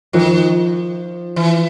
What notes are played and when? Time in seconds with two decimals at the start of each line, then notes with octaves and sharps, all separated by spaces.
0.13 D#3 F3
1.36 E3